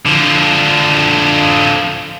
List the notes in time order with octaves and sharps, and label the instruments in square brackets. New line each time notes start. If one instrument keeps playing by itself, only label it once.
[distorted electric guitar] D3 F3